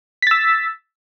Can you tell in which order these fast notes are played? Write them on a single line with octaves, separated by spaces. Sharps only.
B6 A6 E6